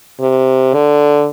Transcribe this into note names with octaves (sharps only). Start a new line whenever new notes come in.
C3
D3